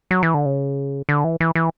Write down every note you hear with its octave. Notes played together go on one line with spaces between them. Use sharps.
F#3
E3
D3
C#3
D3
E3
E3
E3